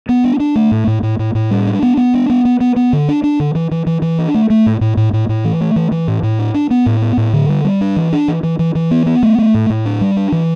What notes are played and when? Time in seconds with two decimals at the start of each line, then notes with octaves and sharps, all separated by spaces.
0.09 B3
0.24 D4
0.40 D4
0.55 A3
0.71 A2
0.87 A2
1.03 A2
1.19 A2
1.35 A2
1.51 G3
1.67 D4
1.83 B3
1.97 B3
2.14 D4
2.29 B3
2.45 B3
2.60 B3
2.76 B3
2.93 D3
3.09 D4
3.23 D4
3.40 D3
3.55 E3
3.71 E3
3.86 E3
4.02 E3
4.19 D4
4.34 A3
4.50 A3
4.66 A2
4.81 A2
4.97 A2
5.13 A2
5.29 A2
5.44 E3
5.61 A3
5.76 E3
5.92 E3
6.08 A2
6.23 A2
6.39 D4
6.54 D4
6.70 B3
6.86 A2
7.02 B3
7.17 A2
7.33 D3
7.49 G3
7.64 G3
7.81 D4
7.96 E3
8.13 D4
8.28 E3
8.43 E3
8.59 E3
8.75 E3
8.91 B3
9.06 B3
9.23 A3
9.38 A3
9.54 A2
9.70 A2
9.85 D4
10.01 G3
10.16 D4
10.32 E3